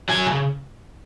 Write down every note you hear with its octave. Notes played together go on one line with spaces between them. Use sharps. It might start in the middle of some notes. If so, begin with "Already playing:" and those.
F#3 G#5
C#3